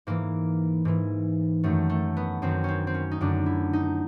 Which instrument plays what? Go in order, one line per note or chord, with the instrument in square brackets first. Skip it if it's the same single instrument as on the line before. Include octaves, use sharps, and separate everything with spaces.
[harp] G#2 E3 A#3
G#2 E3
F#2 D#3 A3
A3
B3
F#2 D#3 C4
C4 C#4
C4
C#4
D#4
F#2 D3 D4
E4
D#4